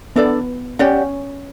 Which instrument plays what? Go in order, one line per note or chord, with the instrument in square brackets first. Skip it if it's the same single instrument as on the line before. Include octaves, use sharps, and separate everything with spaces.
[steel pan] B3 [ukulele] D4 A4 D5
[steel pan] C#4 [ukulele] G4 D5 F#5